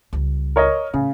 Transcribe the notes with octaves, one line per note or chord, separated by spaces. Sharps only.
C#2 G3
A#4 C#5 D#5
A2 C#3